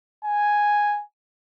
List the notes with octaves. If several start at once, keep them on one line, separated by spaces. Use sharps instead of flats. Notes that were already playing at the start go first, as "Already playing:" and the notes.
G#5